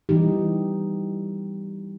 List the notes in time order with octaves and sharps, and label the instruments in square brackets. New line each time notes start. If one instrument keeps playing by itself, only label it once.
[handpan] E3 G3 D#4 G4